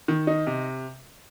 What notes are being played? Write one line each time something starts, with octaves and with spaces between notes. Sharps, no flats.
D#3
D#4
C3